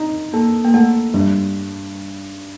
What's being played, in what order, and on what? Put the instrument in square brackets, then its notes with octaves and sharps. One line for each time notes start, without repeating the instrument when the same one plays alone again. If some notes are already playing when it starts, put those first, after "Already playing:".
Already playing: [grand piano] D#4
[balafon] A#3 [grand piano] A4
[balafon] A#3
[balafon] A3 [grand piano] A4
[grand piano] G2 [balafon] G3